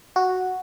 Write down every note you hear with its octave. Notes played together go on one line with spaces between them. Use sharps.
F#4